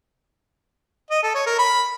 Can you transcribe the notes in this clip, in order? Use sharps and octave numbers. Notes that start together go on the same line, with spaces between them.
D#5
A4
C#5
A#4
B5